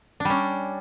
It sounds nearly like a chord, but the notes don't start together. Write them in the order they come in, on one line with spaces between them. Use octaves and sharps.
D4 G3 C#4